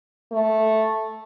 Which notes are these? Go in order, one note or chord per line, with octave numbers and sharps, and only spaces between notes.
A3